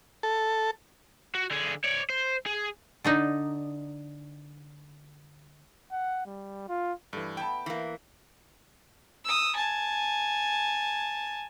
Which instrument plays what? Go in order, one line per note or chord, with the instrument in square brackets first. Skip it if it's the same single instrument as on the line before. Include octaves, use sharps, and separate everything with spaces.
[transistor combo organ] A4
[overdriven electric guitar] F#4
D3 G#4
C#5 D5
C5
G#4
[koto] D3 D4 D#4
[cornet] F#5
G3
F4
[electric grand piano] G2 E3 [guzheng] A3
[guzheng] B3 E4 [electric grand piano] G5 A5
[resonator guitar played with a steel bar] E3 A#3
[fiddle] D#6 E6
G#5 A5